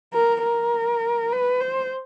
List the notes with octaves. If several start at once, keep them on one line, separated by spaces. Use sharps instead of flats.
A#4
A#4
B4
C5